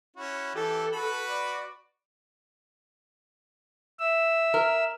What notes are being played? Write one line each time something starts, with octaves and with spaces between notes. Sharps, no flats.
C#4 E4 F#4
E3 G4 A4
F#4 B4 B5
D5
E5 E6
A#4